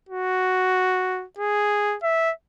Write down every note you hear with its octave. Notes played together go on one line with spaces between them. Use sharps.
F#4
G#4
E5